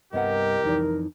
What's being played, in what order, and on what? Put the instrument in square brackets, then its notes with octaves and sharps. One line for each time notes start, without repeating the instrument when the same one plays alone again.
[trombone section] C2 A#4 [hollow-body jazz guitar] G2 B3 F#5 [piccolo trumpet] G4 [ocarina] D#5
[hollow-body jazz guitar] F2 E3 D5 [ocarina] D#4